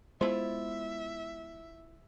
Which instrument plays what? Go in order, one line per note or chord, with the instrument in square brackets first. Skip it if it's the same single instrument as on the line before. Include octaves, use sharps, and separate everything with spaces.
[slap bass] G#3 B3 [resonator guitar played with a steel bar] E4 F4 [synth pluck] C5 [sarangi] E5